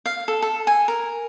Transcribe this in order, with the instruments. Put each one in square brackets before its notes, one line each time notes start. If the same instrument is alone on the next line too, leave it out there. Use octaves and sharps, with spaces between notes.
[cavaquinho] F5
A4
A4
G#5
A#4